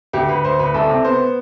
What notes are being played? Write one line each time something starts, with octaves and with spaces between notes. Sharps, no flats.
D2 G4
D2 B4
D2 C5
D2 B4
C2 A4
C3
B3 C5
B3